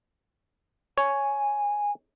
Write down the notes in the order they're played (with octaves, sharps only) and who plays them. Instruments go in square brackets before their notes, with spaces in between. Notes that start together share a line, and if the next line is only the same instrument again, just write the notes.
[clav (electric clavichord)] C#5 [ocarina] G#5